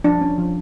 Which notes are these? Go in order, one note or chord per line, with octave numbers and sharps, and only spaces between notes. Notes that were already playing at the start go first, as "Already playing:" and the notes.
F3 D4
C#4
F3